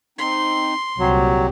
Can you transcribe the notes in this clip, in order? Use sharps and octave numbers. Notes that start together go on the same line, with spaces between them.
C4 D#4 C6
C2 A#2 F#3 C4 G4